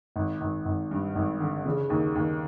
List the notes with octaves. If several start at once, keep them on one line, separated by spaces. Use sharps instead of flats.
G#1
G#1
G#1
G2
G#1
D3
C#3
D#2
D#2